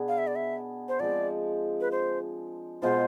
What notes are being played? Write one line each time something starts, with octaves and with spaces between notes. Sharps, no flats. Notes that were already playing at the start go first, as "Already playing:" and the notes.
Already playing: B2 B3 D4 G#4
F5
E5
D5
E5
C5
F3 G#3 C4 D5
B4
C5
B2 G#3 B3 F4 C5